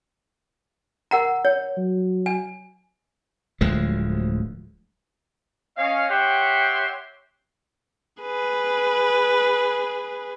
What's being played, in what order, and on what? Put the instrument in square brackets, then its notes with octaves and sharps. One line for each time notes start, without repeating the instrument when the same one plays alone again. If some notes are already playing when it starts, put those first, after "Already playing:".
[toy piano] A#4 F#5 A#5
C#5
[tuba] F#3
[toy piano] G#5
[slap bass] D1 D2 F3 G#3
[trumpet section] C#4 D#5 F5
G4 C#5 E5 F#5 G5 C6
[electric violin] G#4 B4